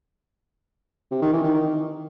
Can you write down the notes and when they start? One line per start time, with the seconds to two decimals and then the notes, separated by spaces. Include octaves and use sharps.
1.11 C3
1.22 D#3
1.33 E3
1.43 D#3
1.54 D#3